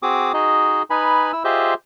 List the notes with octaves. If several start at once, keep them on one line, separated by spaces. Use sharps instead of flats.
C4 F#4 G#4 D6 D#6
D#4 F#4 G#4 D#5
D#4 B4 G#5 B5
E4 E6
F4 G4 G#4 C5 D#5 E5